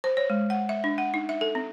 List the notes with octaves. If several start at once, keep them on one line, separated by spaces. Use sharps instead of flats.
C5
C#5
G#3
F#5
E5
D4
F#5
D#4
E5
A4
C4